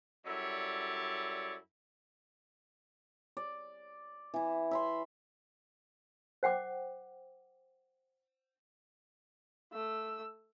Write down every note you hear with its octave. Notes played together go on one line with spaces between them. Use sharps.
F#2 G3 E4 A4 C#5 D5
D5
E3 E4
E5 B5 C6
C5 F#5 G5 D6
A3 E6